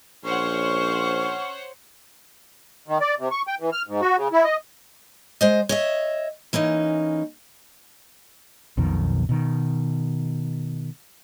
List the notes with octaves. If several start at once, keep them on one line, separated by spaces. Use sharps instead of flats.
A#1 C#4 C5 C#5 F#5 C#6
D#3
D5
C3
C#6
G5
E3
F6
G#2
F#4
C#3
E4
D#5
G#3 C5 D#5
C#5 D#5 E5
E3 A#3 C#4 D#4
B1 F2 B2 D#3
B2 D#3